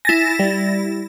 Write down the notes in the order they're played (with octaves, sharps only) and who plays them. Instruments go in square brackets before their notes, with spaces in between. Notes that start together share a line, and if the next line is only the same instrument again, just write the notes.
[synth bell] E4 A6 A#6 [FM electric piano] G#5
[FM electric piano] G3